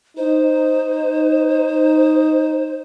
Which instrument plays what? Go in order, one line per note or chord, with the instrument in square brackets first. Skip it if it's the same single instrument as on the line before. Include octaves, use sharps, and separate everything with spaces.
[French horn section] D#4 [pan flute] C5